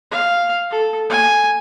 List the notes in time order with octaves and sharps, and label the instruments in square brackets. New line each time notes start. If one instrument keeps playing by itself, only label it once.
[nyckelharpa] F5
A4
G#5